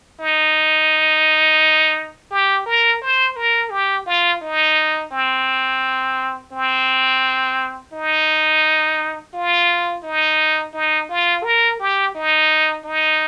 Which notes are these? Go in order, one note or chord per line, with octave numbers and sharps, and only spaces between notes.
D#4
G4
A#4
C5
A#4
G4
F4
D#4
C4
C4
D#4
F4
D#4
D#4
F4
A#4
G4
D#4
D#4